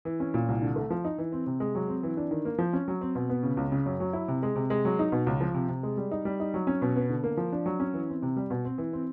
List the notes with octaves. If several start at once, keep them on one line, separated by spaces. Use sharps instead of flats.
E3
C#4
A#2
C2
D3
A3
F3
D#4
E3
C4
C3
G#3
F#3
C4
E3
D4
D#3
A#3
F3
C#4
F#3
C4
B2
B3
C#3
C#2
C#3
F#2
F#3
E4
C3
G#3
C3
G#3
F#3
D#4
B2
C#2
F3
C3
C3
G#3
G3
D#4
G3
D#4
F#3
C#4
B2
B3
D3
A#3
F3
D4
F#3
C#4
E3
C4
C3
G3
B2
C4
E3
C4